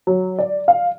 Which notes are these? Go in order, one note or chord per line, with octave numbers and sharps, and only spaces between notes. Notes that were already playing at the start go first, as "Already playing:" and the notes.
F#3
D5
F5